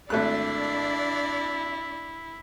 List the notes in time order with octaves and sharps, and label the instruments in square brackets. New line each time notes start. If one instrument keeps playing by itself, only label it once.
[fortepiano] G#1 A3 F#6 [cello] D4 D5 [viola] E4